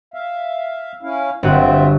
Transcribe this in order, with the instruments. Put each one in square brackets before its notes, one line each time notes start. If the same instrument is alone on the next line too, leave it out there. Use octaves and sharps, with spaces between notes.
[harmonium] E5 F5
C#4 E4 F5
[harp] G1 F#4 [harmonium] C4 F4 E5